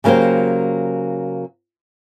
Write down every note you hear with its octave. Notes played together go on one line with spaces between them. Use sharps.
C#3 F#3 A#3 G4 C5